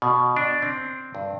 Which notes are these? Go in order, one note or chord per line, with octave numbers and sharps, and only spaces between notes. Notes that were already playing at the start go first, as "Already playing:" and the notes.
B2
D4
C4
G2